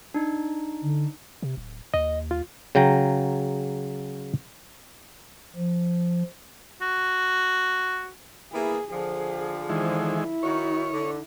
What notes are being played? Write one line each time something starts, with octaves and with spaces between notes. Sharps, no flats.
D4 D#4
D3
C3
D1
D#2 D#5
F4
C#3 F#3 G5 A#5
F3
F#4
A#3 B3 E4 G#4
D3 F3 G#4
D#3 E3 G#3
E4
D#3 F#4 C#5
D3